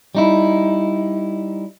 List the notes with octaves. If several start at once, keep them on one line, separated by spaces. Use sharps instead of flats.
G3 D#4 E4